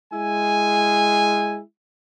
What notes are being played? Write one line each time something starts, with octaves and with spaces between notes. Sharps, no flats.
G#3 E4 G#5